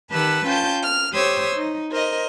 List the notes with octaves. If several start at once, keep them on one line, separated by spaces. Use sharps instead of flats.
D#3 G4 B4 F#5 A5 E6
C#4 F4 G5 A5 G6
F6
G4 C5 C#5 D#6 E6
D#4
A#4 C5 D#5